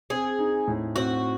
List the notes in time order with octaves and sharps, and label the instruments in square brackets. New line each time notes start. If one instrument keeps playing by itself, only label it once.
[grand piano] C4 [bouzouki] G#4
[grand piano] D#4
A2
[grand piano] C4 [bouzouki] F#4